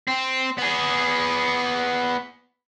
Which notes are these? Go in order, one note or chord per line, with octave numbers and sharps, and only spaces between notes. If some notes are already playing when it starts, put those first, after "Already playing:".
C4
B3 G#4